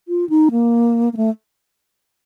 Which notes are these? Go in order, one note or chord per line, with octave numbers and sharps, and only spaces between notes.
F4
D#4
A#3
A#3
A3